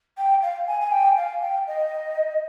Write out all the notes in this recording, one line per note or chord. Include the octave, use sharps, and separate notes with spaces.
G5
F5
G#5
G#5
G5
F5
G5
D#5